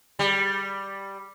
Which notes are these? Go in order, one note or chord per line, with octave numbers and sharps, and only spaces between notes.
G3